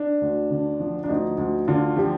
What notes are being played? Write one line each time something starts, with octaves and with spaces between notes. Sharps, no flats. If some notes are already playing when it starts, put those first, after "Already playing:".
Already playing: D4
D2
D3
F3
D4
D2 D#4
D2
D3 F4
F3 G4